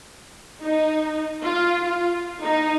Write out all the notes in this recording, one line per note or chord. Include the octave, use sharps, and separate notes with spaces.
D#4
F4
F4
D#4